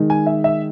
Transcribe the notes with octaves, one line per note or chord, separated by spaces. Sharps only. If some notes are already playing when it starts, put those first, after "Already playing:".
Already playing: D#3 G#3 D#4
G#5
E5
E5